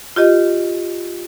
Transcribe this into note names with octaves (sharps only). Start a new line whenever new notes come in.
F4 G4 D#5